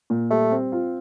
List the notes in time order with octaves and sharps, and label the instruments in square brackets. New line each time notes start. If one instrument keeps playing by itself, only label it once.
[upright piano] A#2
[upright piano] G3 [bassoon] A3
[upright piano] C4
F4